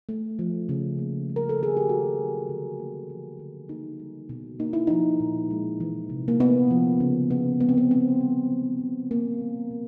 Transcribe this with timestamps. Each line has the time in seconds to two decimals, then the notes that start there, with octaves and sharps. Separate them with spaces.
0.09 A3
0.39 F3
0.69 C#3
0.98 A#3
1.29 G3
1.36 A#4
1.49 A4
1.59 D#3 G#4
1.77 G4
1.89 A3 F#4
2.19 F#3
2.49 D3
2.79 A#3
3.10 F3
3.39 D3
3.69 A#3 D#4
4.00 G3
4.29 B2
4.60 A#3 D#4
4.73 E4
4.87 F3 D#4
5.20 A#2
5.51 G#3
5.80 E3
6.10 C3
6.28 A#3
6.40 A#3 B3
6.71 F3
7.00 C#3
7.30 B2 B3
7.60 G#3 B3
7.69 C4
7.77 B3
7.90 B2 C4
8.21 G3
8.50 E3
8.81 C#3
9.11 A#3
9.41 G3
9.71 B2